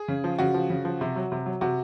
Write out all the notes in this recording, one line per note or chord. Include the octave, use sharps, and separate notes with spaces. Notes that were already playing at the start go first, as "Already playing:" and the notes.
Already playing: G#4
C#3
F3
C#3 F#4
F3
C#3
F3
C3
F#3
C3
F#3
C3 F#4